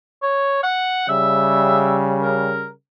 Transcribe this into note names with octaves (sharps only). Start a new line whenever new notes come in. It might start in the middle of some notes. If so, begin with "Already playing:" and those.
C#5
F#5
C#3 G3 E5
A#4